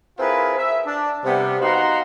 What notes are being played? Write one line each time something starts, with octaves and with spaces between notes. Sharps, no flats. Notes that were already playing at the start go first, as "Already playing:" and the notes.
C4 E4 F4 G#4 A#4 B4
E5
D4
C3 G3 B3
D#4 F#4 F5 F#5 A#5 C6